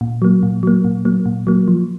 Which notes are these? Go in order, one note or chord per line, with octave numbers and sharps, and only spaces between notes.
A#2
F#3 A#3
A#2
F#3 A#3
A#2
F#3 A#3
A#2
F#3 A#3
F3